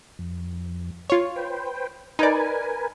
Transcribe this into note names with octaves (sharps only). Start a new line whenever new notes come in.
F2
F4 C#5
B4 C5 G5
D#4 A#4 B4 D5 G#5